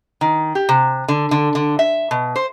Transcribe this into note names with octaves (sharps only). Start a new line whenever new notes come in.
D#3
G4
C3
D3
D3
D3
E5
B2
C5